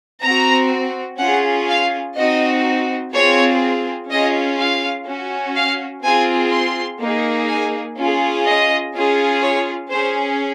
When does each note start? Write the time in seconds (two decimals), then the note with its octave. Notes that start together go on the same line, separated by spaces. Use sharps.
0.23 C4 F#4 A#5
1.20 C#4 F4 G#4 F#5
1.68 F5
2.17 C4 D#4 F#4 D#5
3.14 C4 F4 G#4 C#5
4.10 C#4 F4 G#4 D#5
4.60 F5
5.07 C#4 F#4
5.55 F5
6.04 C4 F4 G#4 G#5
6.53 C6
7.01 A#3 D#4 G#4
7.49 G#5
7.98 C#4 F4 G#4
8.46 D#5
8.95 C#4 F4 G#4
9.42 C#5
9.91 C#4 G#4 C5